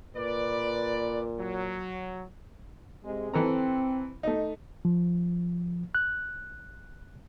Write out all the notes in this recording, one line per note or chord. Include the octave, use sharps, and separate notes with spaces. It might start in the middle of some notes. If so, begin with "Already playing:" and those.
A#2 B4 D5
F#3
C3 G#3
E3 C4 A4 A#5
A3 D#4
F3
F#6